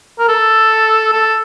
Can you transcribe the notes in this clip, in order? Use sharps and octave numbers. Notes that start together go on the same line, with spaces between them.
A#4
A4
A4